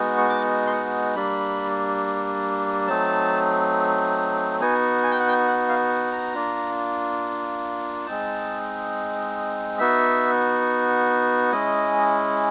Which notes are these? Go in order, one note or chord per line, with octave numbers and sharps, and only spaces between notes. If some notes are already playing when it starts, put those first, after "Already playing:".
Already playing: G#3 B3 D#4 F#4
C#6
D6
C6
C#6
G3 A#3 D4 B5
F#3 A3 C4 D#4 A5
B3 D#4 F#4 G#5
G#5
G5
F#5
G5
F#5
F5
A#5
A#3 D4 F4
G#3 C4 D#4 A5
B3 D#4 F#4 E5
G#3 C#4 E4 D#5